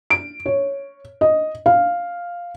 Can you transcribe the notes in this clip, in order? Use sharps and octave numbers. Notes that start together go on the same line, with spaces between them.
D7
C#5
D#5
F5